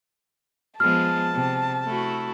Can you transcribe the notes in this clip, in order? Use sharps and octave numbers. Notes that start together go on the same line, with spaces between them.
F3 G#3 B3 A5 F6
C3
A3 E4 F#4